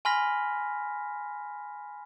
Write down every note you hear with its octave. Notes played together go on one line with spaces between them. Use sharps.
G#5 B5 C6 F6 A#6 B6